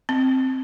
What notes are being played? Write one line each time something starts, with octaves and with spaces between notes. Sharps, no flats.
C4